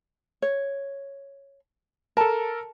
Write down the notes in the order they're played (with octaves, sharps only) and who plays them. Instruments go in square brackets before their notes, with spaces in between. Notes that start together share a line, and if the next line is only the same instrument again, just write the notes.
[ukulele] C#5
[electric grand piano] A4 A#4 [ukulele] A5